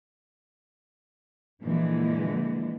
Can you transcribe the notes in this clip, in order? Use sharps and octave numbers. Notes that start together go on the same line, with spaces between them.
F2 A#2 D3 E3 G#3 D4